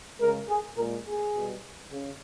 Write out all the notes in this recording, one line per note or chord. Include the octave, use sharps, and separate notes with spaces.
C#3 G#3 A#4
G#4
A#2 G#3 A#4
G#4
B2 G3
C#3